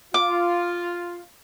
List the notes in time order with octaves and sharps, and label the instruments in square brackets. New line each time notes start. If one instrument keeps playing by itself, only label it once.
[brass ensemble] F4 [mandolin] D6